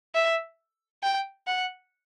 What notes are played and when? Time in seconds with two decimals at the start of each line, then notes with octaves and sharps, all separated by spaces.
0.15 E5
1.03 G5
1.47 F#5